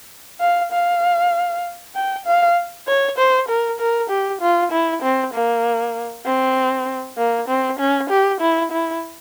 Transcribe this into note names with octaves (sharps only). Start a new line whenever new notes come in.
F5
F5
G5
F5
C#5
C5
A#4
A#4
G4
F4
E4
C4
A#3
C4
A#3
C4
C#4
G4
E4
E4